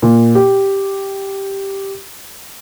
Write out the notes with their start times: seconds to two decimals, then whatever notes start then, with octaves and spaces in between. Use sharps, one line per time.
0.02 A#2
0.35 G4